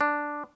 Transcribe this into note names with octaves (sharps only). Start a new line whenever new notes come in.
D4